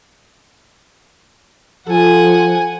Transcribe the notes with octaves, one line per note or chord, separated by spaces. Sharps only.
F3 A4 F#5 G#5